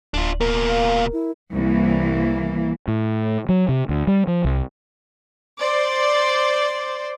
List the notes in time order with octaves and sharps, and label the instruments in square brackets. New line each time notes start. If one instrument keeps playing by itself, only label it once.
[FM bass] D1 [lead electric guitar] D4 F4
[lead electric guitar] B2 A#3 [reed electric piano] A#4
[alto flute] F5
E4
[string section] C2 [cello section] E3 A#3
[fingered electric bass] A2
F#3
C3
D2
G3
F3
C2
[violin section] C5 D5